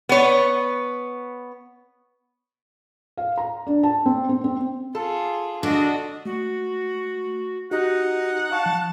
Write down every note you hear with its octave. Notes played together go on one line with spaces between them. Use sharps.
B3 C#5
F5
A#5
D4
A5
C4
C4
C4
F4 G#4 A4
D3 D4 F#4 D#5
A3 F#4
D#4 F#4 G4 F#5
F5 A5 C#6
F3